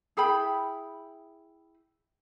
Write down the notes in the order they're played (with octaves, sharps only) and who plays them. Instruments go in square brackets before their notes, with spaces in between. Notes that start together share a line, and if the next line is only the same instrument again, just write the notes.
[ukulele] E4 G#4 G5 B5